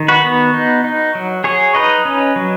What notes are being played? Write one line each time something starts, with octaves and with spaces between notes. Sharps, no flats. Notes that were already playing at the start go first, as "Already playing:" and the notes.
Already playing: D#3
F#4 B4
B3
D#4
D#4
F#3
F#3 G#4 C#5
D#4 B4 D#5
C#4
F#3